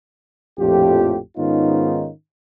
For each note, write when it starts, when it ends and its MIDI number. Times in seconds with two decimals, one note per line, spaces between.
0.59 1.17 34
0.59 1.17 41
0.59 1.17 45
0.59 1.17 65
0.59 1.17 67
1.37 2.09 44
1.37 2.09 51
1.37 2.09 59
1.37 2.09 61
1.37 2.09 63
1.37 2.09 65